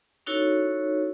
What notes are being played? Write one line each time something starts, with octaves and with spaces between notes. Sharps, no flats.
C#4 D#4 E4 F#4 A4 C#5